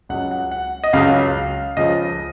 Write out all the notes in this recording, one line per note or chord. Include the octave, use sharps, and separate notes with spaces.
C#2 C#3 F#3 F#5
F#5
F#5
D#5
C#2 C#3 F#3 F5
C#2 C#3 F3 D#5